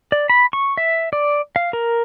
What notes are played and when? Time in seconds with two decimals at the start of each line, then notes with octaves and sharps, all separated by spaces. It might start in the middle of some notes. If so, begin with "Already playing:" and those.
0.12 D5
0.30 B5
0.53 C#6
0.77 E5
1.13 D5
1.56 F5
1.73 A#4